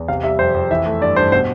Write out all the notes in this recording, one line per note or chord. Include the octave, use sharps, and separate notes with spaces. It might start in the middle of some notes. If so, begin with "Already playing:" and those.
Already playing: E2
C3 F5
G3 E5
F2 C5
F2
E3 E5
A3
G2 D5
G2 C5
B2 C5